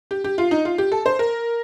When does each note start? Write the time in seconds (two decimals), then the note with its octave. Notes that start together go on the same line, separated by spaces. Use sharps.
0.11 G4
0.24 G4
0.38 F4
0.51 D#4
0.65 F4
0.78 G4
0.92 A4
1.06 C5
1.19 A#4